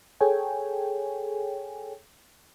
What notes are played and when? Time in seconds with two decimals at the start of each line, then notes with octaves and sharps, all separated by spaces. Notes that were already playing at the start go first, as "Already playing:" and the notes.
0.21 G#4 A4 C#5 G5 G#5